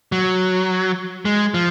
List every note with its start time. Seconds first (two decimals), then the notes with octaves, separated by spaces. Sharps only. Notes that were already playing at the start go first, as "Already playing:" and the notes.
0.12 F#3
1.25 G#3
1.54 F3